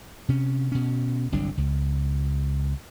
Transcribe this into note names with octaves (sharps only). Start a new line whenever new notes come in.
C3 C#4
B2 C#4
G1 C2 F#3 D4
C#2